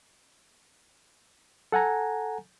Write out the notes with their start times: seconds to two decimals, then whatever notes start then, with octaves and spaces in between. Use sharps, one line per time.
1.72 A4 F#5 G#5 A#5